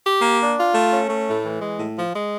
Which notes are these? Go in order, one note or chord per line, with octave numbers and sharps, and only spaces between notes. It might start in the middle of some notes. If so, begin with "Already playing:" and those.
G4
A#3
D4
F4
A3
C#4
A3
A2
E3
G#3
A2
F3
G#3